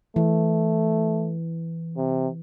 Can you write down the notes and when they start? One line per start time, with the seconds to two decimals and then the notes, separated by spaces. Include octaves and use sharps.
0.16 E3 A3
1.97 C3